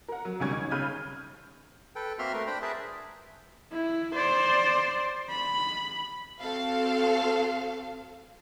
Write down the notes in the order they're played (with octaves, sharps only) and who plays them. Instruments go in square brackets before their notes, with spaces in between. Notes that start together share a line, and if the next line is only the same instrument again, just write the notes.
[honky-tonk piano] A#4 F#5
F#3
C#2 D#3 G3 C#4 C#6 G#6
D#4
G1 C#3 B5 F6 G6 D#7
[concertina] A4 B4 G5
A#3 C4 F#4 E5 C6 F6
A3 A#4 B4
D4 C5 G5 B5
G#4 A#4 B4 E5 A5
[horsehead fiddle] E4
C5 D5
B5
[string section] C4 F#4 A4 F5